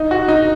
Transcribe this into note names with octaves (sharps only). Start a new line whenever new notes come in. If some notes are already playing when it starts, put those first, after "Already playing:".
Already playing: D#4
F#4
D#4